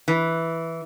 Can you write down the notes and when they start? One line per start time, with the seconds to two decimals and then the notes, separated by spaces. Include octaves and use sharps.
0.08 E3